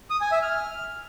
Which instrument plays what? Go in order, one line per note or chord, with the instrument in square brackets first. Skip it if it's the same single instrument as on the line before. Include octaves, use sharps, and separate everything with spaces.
[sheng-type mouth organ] D#6
G#5
E5
F6